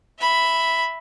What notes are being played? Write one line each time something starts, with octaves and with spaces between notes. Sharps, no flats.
E5 B5